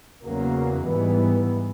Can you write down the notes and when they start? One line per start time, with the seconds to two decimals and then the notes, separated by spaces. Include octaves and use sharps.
0.23 E2 C#3 F#3 A#3
0.85 G#2 E3 G3 B3